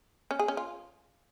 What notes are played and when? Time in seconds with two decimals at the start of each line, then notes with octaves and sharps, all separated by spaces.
0.31 C#4
0.39 G#4
0.48 C#4
0.57 F4